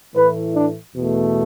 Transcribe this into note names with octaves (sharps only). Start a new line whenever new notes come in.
A2 E3 A3 B4
D4
E2 B2 A3